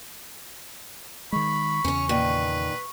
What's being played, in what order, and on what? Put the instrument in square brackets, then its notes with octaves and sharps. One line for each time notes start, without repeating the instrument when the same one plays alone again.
[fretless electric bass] D#3 G#3 [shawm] B5 [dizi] C#6
[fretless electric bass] E2 C#3 [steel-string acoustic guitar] C#4 C#5
[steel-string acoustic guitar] A#2 D#3 [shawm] B4